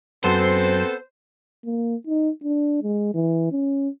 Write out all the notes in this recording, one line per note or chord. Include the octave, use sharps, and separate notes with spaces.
F#2 B3 C4 A4 C5
A#3
D#4
D4
G#3
E3
C#4